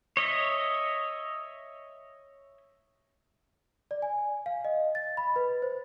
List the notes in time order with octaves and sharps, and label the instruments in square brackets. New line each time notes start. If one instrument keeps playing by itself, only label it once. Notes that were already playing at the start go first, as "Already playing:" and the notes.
[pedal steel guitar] C#5 D#5 E5
[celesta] D5
G#5
F5
D#5
A6
B5
B4
C5